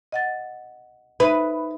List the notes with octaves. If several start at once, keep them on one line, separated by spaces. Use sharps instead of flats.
D#5 F#5 A6
D#4 B4 E5